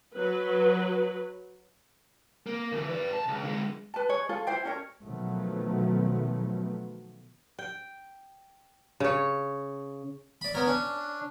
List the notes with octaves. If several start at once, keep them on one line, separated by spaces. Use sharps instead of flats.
F#3 B4
A#3
D2 E3
B4 D5
B1 A5
C#2
D3 G#3
B4 A5
G#4 C#5
F4 G#4 A4
E4 C5 G5
C#4 A4 A#4 C#5
B2 D#3 F3 F#3 A3 B3
G5
C#3 C#5
D5 B5
B3 A#4 C#5
C#4 D4